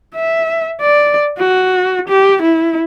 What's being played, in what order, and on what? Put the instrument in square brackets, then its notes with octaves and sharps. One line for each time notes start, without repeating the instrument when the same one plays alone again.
[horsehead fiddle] E5
D5
F#4
G4
E4